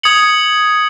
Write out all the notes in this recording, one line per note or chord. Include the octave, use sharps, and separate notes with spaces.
D#6 G#6 C#7 F#7